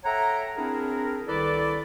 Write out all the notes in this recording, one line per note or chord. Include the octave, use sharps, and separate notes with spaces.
A4 C#5 E5 F#5 G5 A#5
C4 D4 E4 G#4 A#4
C2 D#3 E4 A4 B4 D5